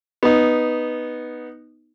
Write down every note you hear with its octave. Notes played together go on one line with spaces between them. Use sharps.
B3 D#4